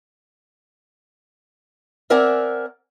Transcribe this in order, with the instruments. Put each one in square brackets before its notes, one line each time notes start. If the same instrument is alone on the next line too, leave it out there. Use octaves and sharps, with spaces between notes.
[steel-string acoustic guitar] C4 A#4 D5 E5 F#5 G#5